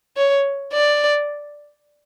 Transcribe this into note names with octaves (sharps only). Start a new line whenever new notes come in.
C#5
D5